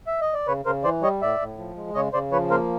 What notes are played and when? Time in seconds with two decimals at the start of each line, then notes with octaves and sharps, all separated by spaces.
0.07 E5
0.21 D#5
0.34 D5
0.47 C#3 B4 C#5
0.65 C#3 A#4 C5
0.84 E3 C5 D5
1.02 G3 C#5 D#5
1.21 A2 D5 E5
1.40 A2
1.58 F3
1.76 G#3
1.95 C#3 C#5 D#5
2.13 C#3 C5 D5
2.32 F3 B4 C#5
2.50 A#3 A#4 C5